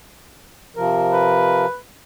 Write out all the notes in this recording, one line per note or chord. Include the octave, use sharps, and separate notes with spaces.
C3 F3 A#4
B4